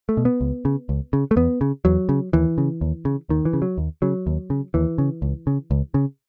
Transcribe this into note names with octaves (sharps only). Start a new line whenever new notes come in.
A3
B2
B3
C#2
C#3
C#2
C#3
A3
E2 B3
C#3
E2 F#3
C#3
D#2 E3
C#3
D#2
C#3
D#2 D#3
E3
C#3
F#3
D#2
C#3 F#3
D#2
C#3
D#2 E3
C#3
C#2
C#3
C#2
C#3